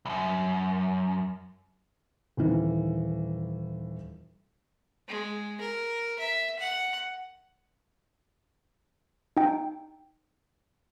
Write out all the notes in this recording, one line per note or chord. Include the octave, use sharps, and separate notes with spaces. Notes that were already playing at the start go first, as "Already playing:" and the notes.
C2 F#2
D#1 D#3 E3
G#3
A#4
E5
F#5
D#4 G5